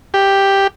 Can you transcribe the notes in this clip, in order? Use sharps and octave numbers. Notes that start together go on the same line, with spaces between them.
G4